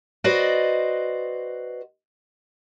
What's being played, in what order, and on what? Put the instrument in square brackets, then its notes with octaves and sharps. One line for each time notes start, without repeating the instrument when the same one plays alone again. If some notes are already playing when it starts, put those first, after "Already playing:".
[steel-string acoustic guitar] F#4 B4 C5 D5 D#5